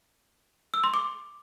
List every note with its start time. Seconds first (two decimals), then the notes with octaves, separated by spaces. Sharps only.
0.74 E6
0.84 C6
0.94 D6